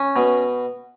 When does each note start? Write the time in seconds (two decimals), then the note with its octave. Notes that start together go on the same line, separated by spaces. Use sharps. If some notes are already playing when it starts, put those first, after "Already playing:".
Already playing: C#4
0.16 B2